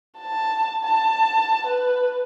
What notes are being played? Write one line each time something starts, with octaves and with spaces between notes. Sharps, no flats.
A5
A5
B4